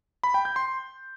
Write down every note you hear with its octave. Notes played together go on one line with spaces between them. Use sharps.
B5
G5
G6
C6